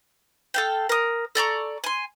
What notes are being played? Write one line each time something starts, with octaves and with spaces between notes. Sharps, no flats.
A4 F5 G5
A#4 D#6
A4 D5 A#5 C#6
G#5 C6